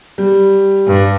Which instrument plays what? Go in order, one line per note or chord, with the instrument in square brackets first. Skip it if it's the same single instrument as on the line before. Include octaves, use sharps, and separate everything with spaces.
[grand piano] G3
[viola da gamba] G2